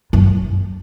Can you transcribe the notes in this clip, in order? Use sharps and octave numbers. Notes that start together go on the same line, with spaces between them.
F#2